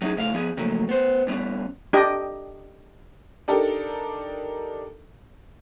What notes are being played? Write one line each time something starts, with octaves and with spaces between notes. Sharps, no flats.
F#3 C#4 D#4 G#4
C#2 A2 E5 F5
F3 B3 G#4
C#3 F3 F#3 A3 A#3
B3 C5
G2 G3 B3 C#4
D4 G4 D#5
D4 D#4 G4 A4 A#4